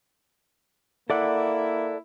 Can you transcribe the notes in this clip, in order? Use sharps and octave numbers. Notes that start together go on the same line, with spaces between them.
A#3 E4 A4 D5 F#5